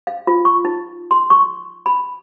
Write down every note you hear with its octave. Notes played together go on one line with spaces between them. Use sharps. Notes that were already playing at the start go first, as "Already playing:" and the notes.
F5
F4
C#6
D#4
C6
C#6
B5